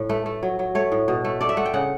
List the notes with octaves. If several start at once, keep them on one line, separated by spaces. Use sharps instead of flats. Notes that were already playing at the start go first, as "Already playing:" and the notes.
Already playing: A2
A3 B4
A3
F#3
F#3
A3 C#5
A2
B2
A3
A3 D5
E5
A3 F#5
G5
C#3 F#5